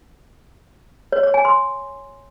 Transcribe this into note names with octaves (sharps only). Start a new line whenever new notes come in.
C#5
C#5
G#5
C6